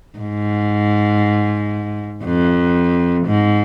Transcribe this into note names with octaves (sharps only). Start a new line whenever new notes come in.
G#2
F2
G#2